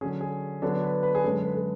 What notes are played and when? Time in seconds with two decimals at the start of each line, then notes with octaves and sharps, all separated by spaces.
0.01 D3 F#3 C#4 G#4
0.21 G#4
0.62 D3 F#3 B3 D4 A4
0.84 B4
1.03 B4
1.15 G#4
1.24 F#2 D3 G#3 C#4 A4
1.45 B4
1.55 A4